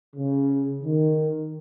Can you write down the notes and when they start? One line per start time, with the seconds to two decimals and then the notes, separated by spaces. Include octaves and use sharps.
0.16 C#3
0.82 D#3